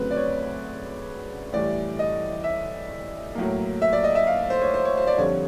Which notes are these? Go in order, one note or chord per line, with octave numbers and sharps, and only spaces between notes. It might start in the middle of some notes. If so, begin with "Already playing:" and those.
Already playing: D2 C#3 F#3 A3 C4 B4
D5
C#5
A2 E3 G3 D5
D#5
E5
A2 F#3 A#3
E5
D5
D#5
E5
F5
C5
C#5
C5
C#5
C5
D5
F2 D3 G3 C#5